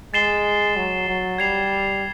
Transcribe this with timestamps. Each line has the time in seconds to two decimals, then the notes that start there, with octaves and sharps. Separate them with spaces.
0.14 G#3 A6 C7 E7 G7
0.76 F#3
1.08 F#3
1.38 G3 G#6 C7 F7